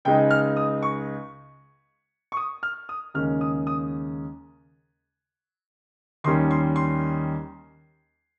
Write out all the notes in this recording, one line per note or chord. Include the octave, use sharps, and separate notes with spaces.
C#2 C#3 G#3 D#4 G5
F6
D#6
C#6
C#6
D#6
F6
D#6
D#2 C#3 G#3 C#4 F6
D#6
D#6
D#2 D#3 G3 C#4 C6
C6
C6